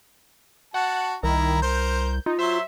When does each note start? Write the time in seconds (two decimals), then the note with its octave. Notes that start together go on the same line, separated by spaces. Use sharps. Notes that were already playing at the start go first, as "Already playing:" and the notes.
0.74 F#4 F#5 A5
1.23 C2 D#3 E4 A#5
1.62 A#4 C5 G6
2.26 D#4 F4
2.39 F#3 C5 E5 C6